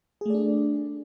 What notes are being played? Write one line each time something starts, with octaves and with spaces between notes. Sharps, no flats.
A3 D4 G#4 D5